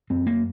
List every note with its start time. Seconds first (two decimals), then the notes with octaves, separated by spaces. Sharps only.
0.10 F#2 C4
0.27 A#3